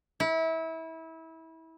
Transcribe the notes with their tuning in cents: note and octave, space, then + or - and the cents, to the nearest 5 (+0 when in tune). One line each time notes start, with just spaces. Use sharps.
E4 -25